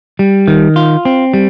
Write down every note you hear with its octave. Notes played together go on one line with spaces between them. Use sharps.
G3
D#3
F4
C4
G3